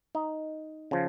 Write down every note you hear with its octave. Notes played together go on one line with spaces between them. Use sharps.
D#4
C#3 F3